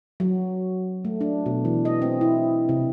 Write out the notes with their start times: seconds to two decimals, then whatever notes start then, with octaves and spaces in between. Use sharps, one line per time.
0.20 F#3
1.05 A3
1.21 D4
1.46 B2
1.65 E3
1.85 D#5
2.02 C4
2.21 E4
2.69 C3